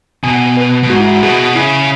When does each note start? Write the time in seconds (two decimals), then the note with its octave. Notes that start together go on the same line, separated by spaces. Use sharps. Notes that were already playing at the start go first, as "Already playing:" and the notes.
0.23 B2 G#5
0.57 B4
0.83 B2
0.90 G#2 F#4
1.00 E4
1.11 F#4
1.23 B2 G#4
1.55 C#3 E4